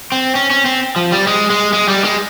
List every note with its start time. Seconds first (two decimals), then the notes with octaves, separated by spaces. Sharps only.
0.12 C4
0.35 C#4
0.50 C#4
0.66 C4
0.96 F3
1.12 G3
1.27 G#3
1.50 G#3
1.73 G#3
1.88 G3
2.04 G#3